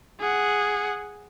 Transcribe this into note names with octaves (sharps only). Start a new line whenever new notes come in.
G#4 F#5